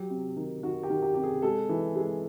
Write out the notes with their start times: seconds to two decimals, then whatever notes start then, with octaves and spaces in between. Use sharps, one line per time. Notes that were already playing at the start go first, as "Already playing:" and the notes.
Already playing: F#3 G4
0.10 C3
0.36 D#3
0.63 D#3 F#4
0.83 G4
0.90 D#3
1.02 G4
1.14 C3 G4
1.24 G#4
1.42 G#3 A4
1.69 E3
1.96 G#3